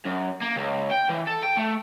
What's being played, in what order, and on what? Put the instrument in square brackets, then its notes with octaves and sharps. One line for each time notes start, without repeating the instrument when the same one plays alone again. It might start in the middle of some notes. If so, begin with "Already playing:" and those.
[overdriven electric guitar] F#2
A#3
C#2
G5
E3
A4
G5
A3